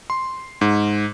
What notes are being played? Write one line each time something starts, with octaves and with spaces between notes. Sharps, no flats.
C6
G#2